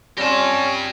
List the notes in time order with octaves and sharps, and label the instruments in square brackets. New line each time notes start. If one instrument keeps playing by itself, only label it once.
[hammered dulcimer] G3 C4 F4 [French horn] C#4 [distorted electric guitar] G4 A5 [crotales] A#6